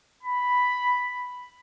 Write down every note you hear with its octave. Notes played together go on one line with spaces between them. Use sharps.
B5